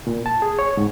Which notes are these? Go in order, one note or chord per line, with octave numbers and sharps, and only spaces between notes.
A#2
A5
G#4
C#5
G#2